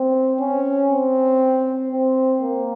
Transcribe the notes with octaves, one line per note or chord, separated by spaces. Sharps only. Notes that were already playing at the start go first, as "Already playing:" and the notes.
Already playing: C4
C#4
C4
C4
A#3